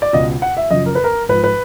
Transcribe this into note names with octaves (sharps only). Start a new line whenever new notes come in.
D5
C#2 B2 D#5
F#5
E5
F#2 C#3 F3 D#5
A#4
B4
A#4
G#2 F3 B4
B4